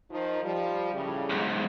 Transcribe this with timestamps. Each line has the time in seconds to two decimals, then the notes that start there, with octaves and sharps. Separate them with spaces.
0.11 D#3 F3 D#4
0.43 F3 G3
0.93 A2 C#3 G3
1.30 B1 G#2